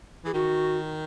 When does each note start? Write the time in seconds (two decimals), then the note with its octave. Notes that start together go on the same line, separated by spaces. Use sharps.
0.25 E3 G#4
0.34 D#3 F#4